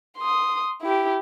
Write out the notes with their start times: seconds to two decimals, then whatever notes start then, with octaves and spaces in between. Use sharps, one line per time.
0.18 C6 D#6
0.82 E4 G4